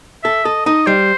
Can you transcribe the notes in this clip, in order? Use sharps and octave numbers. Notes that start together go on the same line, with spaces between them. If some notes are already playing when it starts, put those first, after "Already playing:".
A4 E5
A4 D#5
D#4 D#5
G3 C5